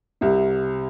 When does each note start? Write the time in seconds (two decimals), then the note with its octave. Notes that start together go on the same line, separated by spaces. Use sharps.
0.21 C2 C3